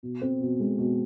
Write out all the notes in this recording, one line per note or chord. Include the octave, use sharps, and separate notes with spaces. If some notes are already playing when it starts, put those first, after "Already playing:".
B2
C4
B2
G#3
B2